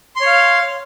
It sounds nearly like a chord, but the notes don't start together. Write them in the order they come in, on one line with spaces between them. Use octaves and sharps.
C6 C#5 F5